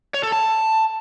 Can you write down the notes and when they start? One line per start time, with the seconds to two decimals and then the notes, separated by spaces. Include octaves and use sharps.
0.14 C#5
0.23 A4
0.32 A5